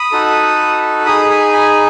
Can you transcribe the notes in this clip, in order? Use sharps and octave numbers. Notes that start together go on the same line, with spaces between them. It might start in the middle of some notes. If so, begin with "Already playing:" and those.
Already playing: B5 D#6
D#4 F#4 A4
D#4 G#4 B5 D#6
G#5 B5
G#5 B5